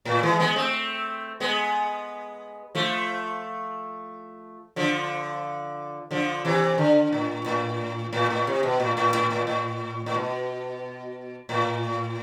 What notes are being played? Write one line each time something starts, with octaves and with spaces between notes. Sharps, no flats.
A2
E3 G#3
G#3 B3
A3 C4
G#3 B3
F3 A3
D3 F3
D3 F3
C3 E3
D3
A2
A2
A2
A2
C3
B2
A2
A2
A2
A2
A2
A2
B2
A2